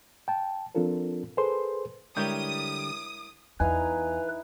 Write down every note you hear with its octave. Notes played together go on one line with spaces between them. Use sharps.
G5 A5
F3 C4 D4 F4 A4 A#4
G#4 A4 B4 C5 C6
D3 G3 G#3 E4 G4 A#4 C#5 D#6
E2 D#4 E4 B4 F5 G#5